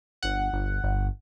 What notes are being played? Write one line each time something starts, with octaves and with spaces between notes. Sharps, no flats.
G1 F#5
G1
G1